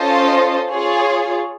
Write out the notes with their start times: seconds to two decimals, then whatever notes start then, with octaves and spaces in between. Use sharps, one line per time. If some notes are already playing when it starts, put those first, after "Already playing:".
Already playing: C#4 F4 A4 C5 D#5
0.70 F4 G#4 C#5